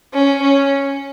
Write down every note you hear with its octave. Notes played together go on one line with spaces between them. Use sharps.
C#4
C#4